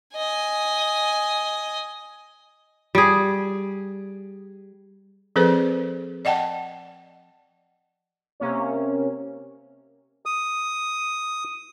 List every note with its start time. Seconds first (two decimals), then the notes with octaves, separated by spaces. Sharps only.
0.17 D#5 G#5
2.95 G3 G#4
5.36 F3 C4 G#4 A4 B4 C5
6.25 D5 D#5 F#5 G5 A5
8.40 C3 A#3 C#4
10.26 D#6